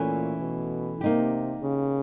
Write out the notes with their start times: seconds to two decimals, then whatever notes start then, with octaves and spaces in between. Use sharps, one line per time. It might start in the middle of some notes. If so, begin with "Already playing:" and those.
Already playing: A#2 E3 A3 C#4
0.40 B2
1.01 C3 A#3 D#4 G4
1.62 C#3